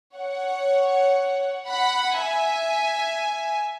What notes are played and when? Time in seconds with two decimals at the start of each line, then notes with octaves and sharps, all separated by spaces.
0.15 C#5 F#5
1.68 F#5 B5
2.19 E5 G#5